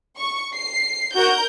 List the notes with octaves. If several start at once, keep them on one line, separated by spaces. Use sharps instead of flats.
C#6
C7
F#4 A#4 G6